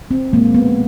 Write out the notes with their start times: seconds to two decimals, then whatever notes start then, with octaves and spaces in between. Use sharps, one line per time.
0.11 C4
0.33 A#2 F3 G#3 A#3
0.55 B3